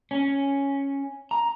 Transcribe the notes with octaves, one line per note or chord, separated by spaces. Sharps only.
C#4
A#5